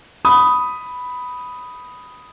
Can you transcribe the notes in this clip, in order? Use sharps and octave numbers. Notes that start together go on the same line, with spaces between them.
B5 D#6